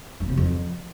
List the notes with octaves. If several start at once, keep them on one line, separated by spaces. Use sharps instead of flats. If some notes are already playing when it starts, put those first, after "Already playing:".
G2
C3
F2